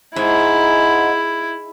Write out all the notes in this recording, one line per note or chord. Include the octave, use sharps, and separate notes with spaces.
G#2 E4